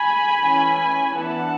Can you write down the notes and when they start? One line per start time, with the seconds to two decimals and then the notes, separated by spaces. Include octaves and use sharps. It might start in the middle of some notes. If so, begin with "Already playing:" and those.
Already playing: G#5 B5
0.39 E3 A3 C#4
1.13 E3 B3 D4 F#5 A5